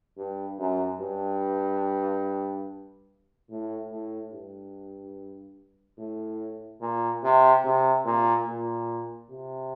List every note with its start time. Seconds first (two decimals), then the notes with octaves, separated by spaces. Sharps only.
0.17 G2
0.59 F#2
1.00 G2
3.50 A2
3.90 A2
4.32 G2
5.98 A2
6.81 A#2
7.23 C3
7.65 C3
8.05 A#2
8.47 A#2
9.31 C3